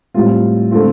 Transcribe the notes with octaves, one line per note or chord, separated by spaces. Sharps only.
A2 G3 C4 F4
D3 A3 C4 F4